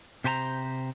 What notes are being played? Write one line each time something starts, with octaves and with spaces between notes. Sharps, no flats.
C3 G4 C5 G#5 A#5